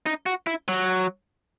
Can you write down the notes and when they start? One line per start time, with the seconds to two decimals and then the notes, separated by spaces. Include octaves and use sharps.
0.06 D#4
0.26 F#4
0.47 E4
0.68 F#3